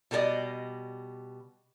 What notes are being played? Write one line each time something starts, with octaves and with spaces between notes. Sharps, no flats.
B2 G3 A4 A#4 D5 D#5